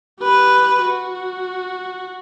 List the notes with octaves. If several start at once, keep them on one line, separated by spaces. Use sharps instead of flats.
G4 B4
F#4